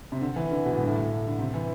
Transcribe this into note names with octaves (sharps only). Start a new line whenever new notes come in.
C3
D3
E3
D3
B2
A2
G2
A2
D3
C3
E3